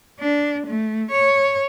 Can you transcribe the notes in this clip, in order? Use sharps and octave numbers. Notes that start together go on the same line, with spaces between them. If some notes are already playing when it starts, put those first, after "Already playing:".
D4
A3
C#5